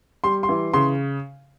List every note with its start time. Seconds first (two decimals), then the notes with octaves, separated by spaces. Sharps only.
0.24 G3 C6
0.43 C6
0.49 E3
0.73 C#3 C6